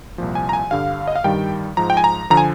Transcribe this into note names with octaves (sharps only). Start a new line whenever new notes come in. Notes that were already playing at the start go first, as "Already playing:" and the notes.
C2 A#2 F3
G#5
A#5
G#5
G2 D3 G3 F5
D#5
F5
G2 D#3 G3 G5
G#2 F3 A#5
G5
G#5
A#5
D3 F3 A#5
G#5